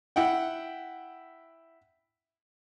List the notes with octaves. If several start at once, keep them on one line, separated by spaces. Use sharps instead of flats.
E4 F#5 G5